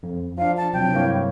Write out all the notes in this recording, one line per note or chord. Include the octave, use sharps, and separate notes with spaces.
F2
F3 D4 F5
A5
C3 F#3 C4 G5
G2 A#3 C4 E4 C#5